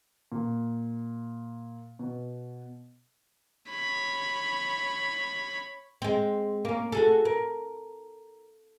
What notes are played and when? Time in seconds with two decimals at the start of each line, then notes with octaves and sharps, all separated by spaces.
0.32 A#2
1.99 B2
3.70 C#5 B5
6.02 G#3 C4
6.65 A#3 C#4
6.92 F#4 G#4 A4
7.25 A#4